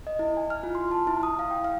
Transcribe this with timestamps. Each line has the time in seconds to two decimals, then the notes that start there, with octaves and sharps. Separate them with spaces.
0.07 D#5
0.19 E4
0.37 G#5
0.50 F6
0.63 F4
0.75 C6
0.91 A5
1.07 E4
1.23 D#6
1.39 F5
1.51 G5
1.64 F5